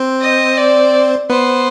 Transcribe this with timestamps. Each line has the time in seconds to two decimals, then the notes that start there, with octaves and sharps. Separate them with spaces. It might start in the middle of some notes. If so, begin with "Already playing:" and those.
Already playing: C4 C5
0.21 D#5
0.57 D5
1.30 B3 B4 C5